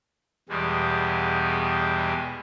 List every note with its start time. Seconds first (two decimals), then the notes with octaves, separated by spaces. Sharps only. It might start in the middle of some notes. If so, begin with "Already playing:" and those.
0.49 E2 B2 G3 G#3